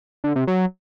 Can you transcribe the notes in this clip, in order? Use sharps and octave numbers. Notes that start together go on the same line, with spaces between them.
D3
C3
F#3